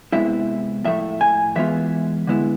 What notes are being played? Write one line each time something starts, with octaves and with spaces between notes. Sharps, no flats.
C3 G#3 B3 E4 E5
A2 F3 A3 E5
G#5
E3 G#3 B3 F4 E5
D3 G#3 B3 E4